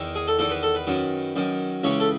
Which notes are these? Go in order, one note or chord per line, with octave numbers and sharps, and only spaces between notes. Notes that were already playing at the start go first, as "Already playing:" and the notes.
Already playing: E2 D#3
G#4
A4
E2 D#3 A4
B4
A4
B4
F#2 D#3
F#2 D#3
C#2 C#3 E3 C#5
A4